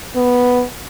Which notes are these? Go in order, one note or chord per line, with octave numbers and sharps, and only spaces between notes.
B3